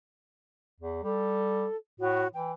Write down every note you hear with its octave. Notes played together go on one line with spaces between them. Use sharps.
E2
G3 A4
A2 F#4
E3 G5